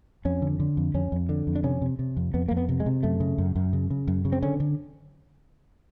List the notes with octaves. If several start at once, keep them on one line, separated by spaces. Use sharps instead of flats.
F2 C#4
D3
D3
F2
F2 C#4
F2
D3
F2
D4
C3 C#4
C3
C3
F2
F2 B3
F2 A#3
B3
C3
G#3
C3
F#2 A3
C#3
F#2
F#2
C#3
C#3
F#2
C#3
C4
D3 C#4
D3